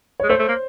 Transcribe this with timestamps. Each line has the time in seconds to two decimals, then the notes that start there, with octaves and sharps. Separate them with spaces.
0.20 G#3 C#5
0.29 A3 C5
0.40 A3
0.48 A#3